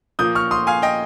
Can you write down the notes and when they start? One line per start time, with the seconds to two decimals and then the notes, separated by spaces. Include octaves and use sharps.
0.19 A#2 F3 A#3 D#6 G6
0.35 C#6 F6
0.51 C6 D#6
0.67 F5 G#5
0.82 D#5 G5